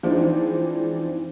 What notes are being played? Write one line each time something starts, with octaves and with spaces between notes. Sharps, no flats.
E3 F3 G#3 C4 D4 D#4